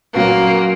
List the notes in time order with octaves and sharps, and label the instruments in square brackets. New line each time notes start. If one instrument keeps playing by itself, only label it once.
[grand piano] A#2 F#3 C#4 F#4 B4 [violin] A#3